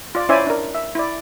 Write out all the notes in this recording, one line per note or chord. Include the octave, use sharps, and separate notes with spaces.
F4 D5
C#4 E4 C5 D5 E5 G#5
D4 A#4
E5
E4 D5